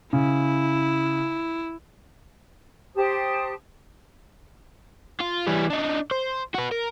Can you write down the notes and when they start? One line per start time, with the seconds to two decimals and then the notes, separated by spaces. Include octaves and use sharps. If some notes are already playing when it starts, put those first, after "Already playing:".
0.13 C#3 E4
2.95 G4 C5 A5 D#6
5.20 F4
5.47 E3 G3
5.70 D4 D#4
6.11 C5
6.55 F#4 B4
6.72 A#4